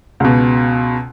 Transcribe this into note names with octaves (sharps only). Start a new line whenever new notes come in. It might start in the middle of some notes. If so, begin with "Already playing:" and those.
C#2 B2